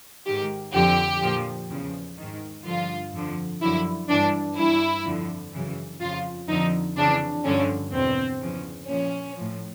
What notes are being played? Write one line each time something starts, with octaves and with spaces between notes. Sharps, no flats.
G#2 D#3 G4
F2 D3 F3 G4
A#2 F3
E2 C#3 F3
G#2 D#3
G2 D3 F3 F4
F2 D3 F3
F#2 D3 F3 E4
G2 E3 D4
G2 E3 E4
F2 D3 F3
F#2 C#3 E3
F2 C#3 F3 F4
F2 D3 F3 D#4
F2 C#3 E3 D4
G2 D3 F3 C#4
E2 B2 C4
E2 C#3 F3
A#2 F3 C#4
A2 F3